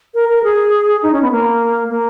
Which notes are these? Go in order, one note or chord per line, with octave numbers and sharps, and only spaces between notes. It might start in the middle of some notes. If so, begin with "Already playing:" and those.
A#4
A#4
G#4
D#4
C#4
B3
A#3
A#3